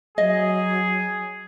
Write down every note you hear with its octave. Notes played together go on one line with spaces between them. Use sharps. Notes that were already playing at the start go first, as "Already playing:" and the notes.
F#3 G#4 D#5